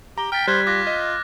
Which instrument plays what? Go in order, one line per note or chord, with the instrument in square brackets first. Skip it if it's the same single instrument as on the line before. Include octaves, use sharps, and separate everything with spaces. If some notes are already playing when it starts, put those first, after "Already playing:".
[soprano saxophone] G4 [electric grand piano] A#5 [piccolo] G7
[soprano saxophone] G5 [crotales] F6 A6 [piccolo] B6
[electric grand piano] G3 [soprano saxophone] C5 [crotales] F#6 G#6
[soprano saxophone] F4 [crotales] D6 F#6 A#6
[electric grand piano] D#5